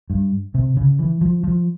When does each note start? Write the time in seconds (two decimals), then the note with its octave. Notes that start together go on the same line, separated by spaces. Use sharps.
0.10 G2
0.54 C3
0.77 C#3
0.99 E3
1.21 F3
1.44 F3